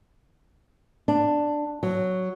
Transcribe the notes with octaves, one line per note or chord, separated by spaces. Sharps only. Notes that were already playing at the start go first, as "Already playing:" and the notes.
D4
F#3